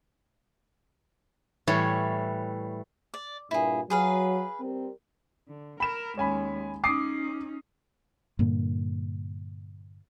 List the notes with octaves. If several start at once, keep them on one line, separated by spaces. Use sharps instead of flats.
A2 E3 G3 C#5
D5
G2 A#2 E4 G#4
F#3 G#4 B4 F5
G3 C4 A#4
D3
A#4 B5 E7
D#2 G#3 C#4 G#5 B5
C#4 D#4 D6 D#6 C7
G2 A#2 D3 A#3